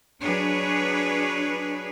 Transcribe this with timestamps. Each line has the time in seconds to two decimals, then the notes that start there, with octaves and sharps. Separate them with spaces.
0.21 F#3 D4 G#4 B4 C#5